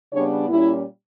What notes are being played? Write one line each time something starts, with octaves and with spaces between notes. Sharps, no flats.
C#3 G3 B3 D4 C#5
A#2 G3 C#4 E4